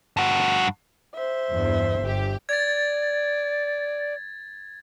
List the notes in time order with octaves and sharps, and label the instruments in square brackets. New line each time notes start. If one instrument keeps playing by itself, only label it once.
[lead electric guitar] G2 F#4
[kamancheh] C5 E5
[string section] E2 G2
G1 G4
[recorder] D5 [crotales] G#6 A6